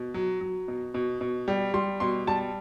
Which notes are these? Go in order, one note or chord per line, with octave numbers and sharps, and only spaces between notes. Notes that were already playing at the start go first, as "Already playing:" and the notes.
Already playing: B2
F#3
F#3
B2
B2
B2
G3
G3 C6
B2 C6
G3 A5